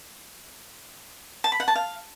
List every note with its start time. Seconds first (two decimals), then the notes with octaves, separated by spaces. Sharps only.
1.44 A5
1.52 B5
1.60 F#5
1.68 A5
1.75 F5